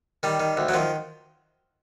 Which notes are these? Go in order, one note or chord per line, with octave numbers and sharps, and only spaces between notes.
D#3 G3
D#3
D2
F#3
D#3 F3